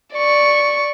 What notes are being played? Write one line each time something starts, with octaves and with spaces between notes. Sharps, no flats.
D5 C#6